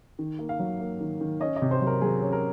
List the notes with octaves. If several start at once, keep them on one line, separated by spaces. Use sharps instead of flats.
D#3
A#3
F5
F#3
A#3
D#3
D#3
C#4 D#5
D#5
C3
C5
F#3
A#4
F#3 G#4
C#4
A#4